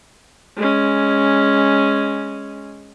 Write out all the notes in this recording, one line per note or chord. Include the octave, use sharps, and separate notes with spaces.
G#3 C#4